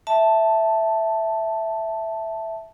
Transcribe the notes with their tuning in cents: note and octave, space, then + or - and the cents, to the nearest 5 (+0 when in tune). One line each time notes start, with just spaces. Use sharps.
E5 +0 A5 +0